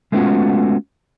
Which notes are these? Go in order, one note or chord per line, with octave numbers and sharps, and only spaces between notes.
G#3 A3 B3 C#4 F4 F#4